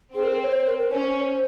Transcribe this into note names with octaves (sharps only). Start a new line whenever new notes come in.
C4 G#4
A#4
C5
C#5
C5
A#4
A#4
C#4 C5